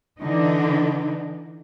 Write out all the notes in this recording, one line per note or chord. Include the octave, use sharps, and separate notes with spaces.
D3 E3 D4 D#4